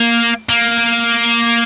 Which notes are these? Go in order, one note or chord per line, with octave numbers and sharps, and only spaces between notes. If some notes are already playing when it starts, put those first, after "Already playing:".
Already playing: A#3
A#3